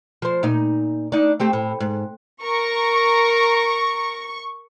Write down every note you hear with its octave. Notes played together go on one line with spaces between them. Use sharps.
F3 C5
A#2 D#4
D4 D#4
A3 C4 G4
A2
G#2
A#4 A#5 C#6